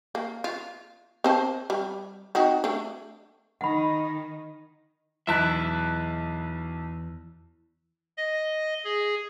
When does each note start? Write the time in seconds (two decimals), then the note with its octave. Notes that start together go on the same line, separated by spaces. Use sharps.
0.15 A#3
0.44 F4
1.24 C4 C5 A5
1.70 G3
2.35 C4 D#4 F#4
2.64 A3 D4
3.61 D#3 D#4 F#5 B5
5.27 B1 E2 E4 E5 A5 F#6
8.17 D#5
8.84 G#4